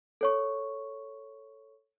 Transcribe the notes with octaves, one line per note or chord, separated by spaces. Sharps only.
A4 C#5 C#6